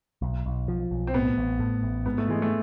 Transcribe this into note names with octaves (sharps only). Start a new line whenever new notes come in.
B1
B1
F3
B1
C4
A2 B3
A1
A2
A1
G#2 B3
A3
E3 G#3
A3